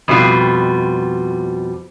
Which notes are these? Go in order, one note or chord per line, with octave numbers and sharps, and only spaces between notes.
F2 B2 G3 F4